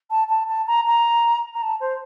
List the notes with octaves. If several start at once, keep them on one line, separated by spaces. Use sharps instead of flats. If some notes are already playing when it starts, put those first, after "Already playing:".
A5
A5
A5
A#5
A#5
A#5
A5
C5